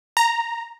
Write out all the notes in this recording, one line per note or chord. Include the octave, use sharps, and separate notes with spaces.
A#5